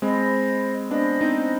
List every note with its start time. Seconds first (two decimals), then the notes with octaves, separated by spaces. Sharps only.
0.01 G#3 C4 C5 D#5 B5
0.90 B3 D4 C5 D#5 B5
1.21 C4 D#4